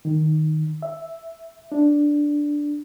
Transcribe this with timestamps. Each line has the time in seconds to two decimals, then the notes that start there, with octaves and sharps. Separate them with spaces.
0.05 D#3
0.82 E5
1.72 D4